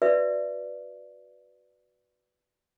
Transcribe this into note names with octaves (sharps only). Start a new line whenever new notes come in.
F#4 B4 D5 E5